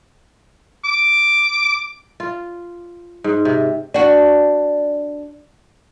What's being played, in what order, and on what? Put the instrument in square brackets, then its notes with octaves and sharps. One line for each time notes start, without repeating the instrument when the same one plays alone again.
[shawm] D6
[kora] F4
G#2
C3
[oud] D4 F#4